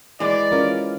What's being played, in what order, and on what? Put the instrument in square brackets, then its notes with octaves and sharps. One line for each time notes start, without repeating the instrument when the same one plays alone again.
[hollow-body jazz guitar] E3 G#3 [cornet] D5
[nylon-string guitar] C#4 F4 A#4